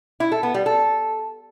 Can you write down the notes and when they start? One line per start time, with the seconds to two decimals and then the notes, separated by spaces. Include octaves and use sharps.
0.20 E4
0.32 A4
0.43 B3
0.54 G3
0.66 A4